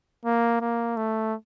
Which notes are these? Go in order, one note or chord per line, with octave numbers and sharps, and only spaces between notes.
A#3
A#3
A3